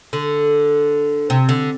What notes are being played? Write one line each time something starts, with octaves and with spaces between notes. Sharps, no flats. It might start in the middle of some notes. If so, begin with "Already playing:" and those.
D3
C3
D3